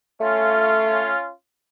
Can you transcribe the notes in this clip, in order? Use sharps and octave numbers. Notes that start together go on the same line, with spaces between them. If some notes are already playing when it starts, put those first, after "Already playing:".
A3 C#4 F4